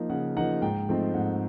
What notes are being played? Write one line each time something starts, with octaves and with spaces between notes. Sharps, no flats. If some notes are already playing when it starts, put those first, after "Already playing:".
Already playing: F3 A#3 D#4
C#3 F#5
F3 A#3 D#4 F#5
G#2 G5
F3 A3 C4 D#4
G#2 F#5